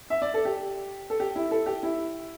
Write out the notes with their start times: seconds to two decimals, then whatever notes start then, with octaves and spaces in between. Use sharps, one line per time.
0.10 E5
0.22 D5
0.34 A4
0.45 G4
1.10 A4
1.20 G4
1.36 E4
1.51 A4
1.66 G4
1.83 E4